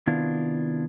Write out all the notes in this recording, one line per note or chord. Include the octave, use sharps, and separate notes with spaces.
C3 D#3 B3 D4 E4 F4